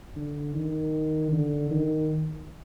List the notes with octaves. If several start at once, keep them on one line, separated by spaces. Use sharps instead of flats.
D3
D#3
D3
D#3